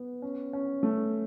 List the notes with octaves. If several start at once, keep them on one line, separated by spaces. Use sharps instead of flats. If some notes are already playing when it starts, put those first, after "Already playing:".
Already playing: B3
C#4
C#4
A3